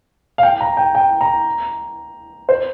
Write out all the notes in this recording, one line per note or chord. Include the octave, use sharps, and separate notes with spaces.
F5
G5
A#5
G5
G5
A#5
C5